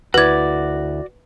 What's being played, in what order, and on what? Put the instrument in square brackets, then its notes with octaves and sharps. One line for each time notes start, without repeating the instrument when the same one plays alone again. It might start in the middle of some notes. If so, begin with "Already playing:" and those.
[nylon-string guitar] D2 E4 [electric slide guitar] F#4 D5 [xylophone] B4 G#6